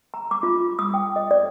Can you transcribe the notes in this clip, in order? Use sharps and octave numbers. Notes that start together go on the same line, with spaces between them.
A#5
D6
F4
D#6
G5
D#5
D5